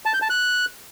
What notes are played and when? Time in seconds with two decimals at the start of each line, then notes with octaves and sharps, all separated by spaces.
0.06 A5
0.14 G6
0.22 A5
0.30 F#6